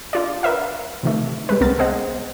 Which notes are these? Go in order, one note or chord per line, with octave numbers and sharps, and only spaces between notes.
D4 F4 D5
A#4 B4 E5 F5
C3 D#3 A3
G3 G#3 B4
C2 B3 C4 A#4 A6
G#4 C5 D#5 F#5